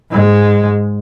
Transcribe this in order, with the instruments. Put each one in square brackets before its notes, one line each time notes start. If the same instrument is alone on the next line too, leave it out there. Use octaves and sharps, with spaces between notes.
[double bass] G#2 G#3